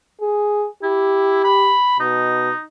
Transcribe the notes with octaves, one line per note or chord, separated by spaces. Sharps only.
G#4
E4 G4
B5
B2 D#4